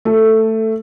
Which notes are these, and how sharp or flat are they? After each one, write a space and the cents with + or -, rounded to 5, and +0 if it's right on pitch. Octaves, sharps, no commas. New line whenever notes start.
A3 +10 A4 +0